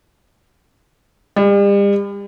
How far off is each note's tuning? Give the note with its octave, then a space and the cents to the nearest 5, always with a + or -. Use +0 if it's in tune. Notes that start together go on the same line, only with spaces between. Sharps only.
G3 +40